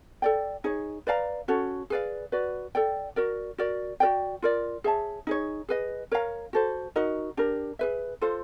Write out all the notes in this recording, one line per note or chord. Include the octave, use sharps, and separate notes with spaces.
A4 D5 G5
D#4 G#4 C#5
B4 D5 F5 A#5
C#4 F#4 A4 C#5
G#4 B4 D5 F5
F#4 B4 D5
A4 D5 G5
F#4 A#4 D5
F#4 A#4 D5
F#4 A#4 D5 G5
F4 A#4 D5
G#4 C#5 E5 A5
D#4 G#4 C#5
G#4 B4 D#5
A#4 C#5 F5 A#5
F#4 A4 C5
D#4 F#4 A#4 D#5
D4 G4 A#4
G#4 B4 E5
F4 A4 C5 F5